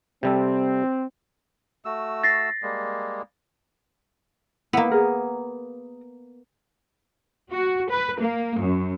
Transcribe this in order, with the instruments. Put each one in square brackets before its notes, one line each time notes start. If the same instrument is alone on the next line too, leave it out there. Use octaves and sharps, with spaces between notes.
[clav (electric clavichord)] C3 G3 A4 [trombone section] C4
[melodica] A3 F#4 E6
[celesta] A6 A#6 C7
[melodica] G3 G#3 A#3
[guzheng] A#3 B3 [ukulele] E4
[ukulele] G#4 A#4
[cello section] F#4
B4
A#3
F#2